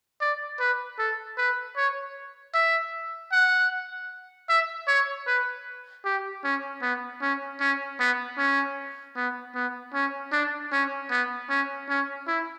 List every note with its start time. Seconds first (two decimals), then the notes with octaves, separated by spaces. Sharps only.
0.21 D5
0.60 B4
0.99 A4
1.38 B4
1.76 C#5
2.54 E5
3.32 F#5
4.49 E5
4.87 C#5
5.27 B4
6.05 G4
6.44 C#4
6.82 B3
7.22 C#4
7.60 C#4
8.00 B3
8.38 C#4
9.16 B3
9.55 B3
9.94 C#4
10.32 D4
10.72 C#4
11.11 B3
11.49 C#4
11.89 C#4
12.27 E4